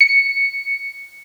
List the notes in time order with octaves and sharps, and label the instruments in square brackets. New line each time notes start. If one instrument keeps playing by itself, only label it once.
[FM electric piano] C#7